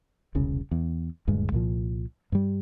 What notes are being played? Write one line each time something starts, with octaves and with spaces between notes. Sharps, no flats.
E1 C2 C#3
E2
D#1 D2 G2 G#3
C2 A#2 F3
G2 G3